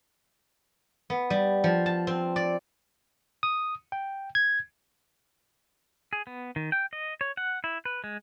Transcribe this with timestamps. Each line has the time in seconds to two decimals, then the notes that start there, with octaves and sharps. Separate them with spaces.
1.10 B3
1.30 G3
1.64 F3
1.86 A5
2.07 C4
2.36 D5
3.43 D#6
3.92 G5
4.35 G#6
6.13 G#4
6.27 B3
6.56 D#3
6.72 G5
6.93 D#5
7.21 C#5
7.37 F#5
7.64 E4
7.85 B4
8.04 G#3